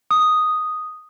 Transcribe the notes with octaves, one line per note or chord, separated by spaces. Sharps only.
D#6